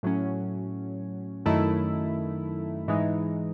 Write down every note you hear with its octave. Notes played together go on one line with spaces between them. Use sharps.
A2 F#3 C#4
F#2 D#3 A3 E4
G#2 E3 G#3 D#4